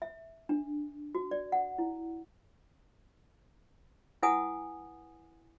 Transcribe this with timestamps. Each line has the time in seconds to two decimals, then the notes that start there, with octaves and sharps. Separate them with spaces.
0.02 E5
0.49 D4
1.15 F#4
1.31 D5
1.52 F#5
1.78 E4
4.23 E4 B4 F#5 G#5 D#6